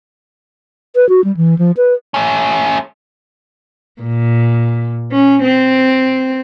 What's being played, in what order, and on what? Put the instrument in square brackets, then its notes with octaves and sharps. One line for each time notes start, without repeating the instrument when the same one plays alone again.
[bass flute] B4
F#4
G3
E3
F3
B4
[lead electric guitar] A3 C#4
[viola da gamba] A#2
C#4
C4